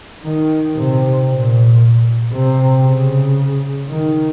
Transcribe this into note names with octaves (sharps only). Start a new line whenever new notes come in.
D#3
C3
A#2
C3
C#3
D#3